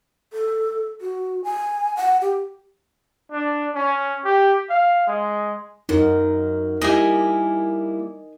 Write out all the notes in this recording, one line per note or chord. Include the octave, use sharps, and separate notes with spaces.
A4
F#4
G#5
F#5
G4
D4
C#4
G4
F5
G#3
F#2 F#3 D#4 A#4
G3 A#3 E4 D#5 G#5